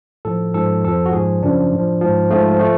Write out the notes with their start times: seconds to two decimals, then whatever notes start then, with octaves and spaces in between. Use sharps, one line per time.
0.25 A2 F3 A4
0.54 G#2 F3 A4
0.84 F2 F3 A4
1.06 F#4
1.13 G#2 F3 G#4
1.43 F#2 C#3 F3 D4
1.72 A2 F3
2.01 G#2 F3
2.30 G#2 F3 A3
2.60 F3 A3